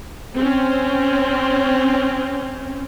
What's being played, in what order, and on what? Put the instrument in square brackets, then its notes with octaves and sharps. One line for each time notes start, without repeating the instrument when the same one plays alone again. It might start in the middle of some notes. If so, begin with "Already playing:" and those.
[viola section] C4 C#4